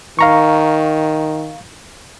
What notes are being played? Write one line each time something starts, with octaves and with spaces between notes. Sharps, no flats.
D#3 F5 A#5 C#6